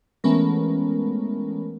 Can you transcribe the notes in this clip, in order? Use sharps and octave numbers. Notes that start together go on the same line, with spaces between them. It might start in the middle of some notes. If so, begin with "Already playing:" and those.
E3 G#3 A3 B3 C#4 A#4